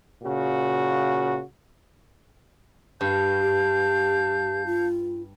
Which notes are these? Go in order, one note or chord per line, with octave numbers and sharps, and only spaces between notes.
A#2 C#3 F#4
G2 F5 A5 G6
G4
F4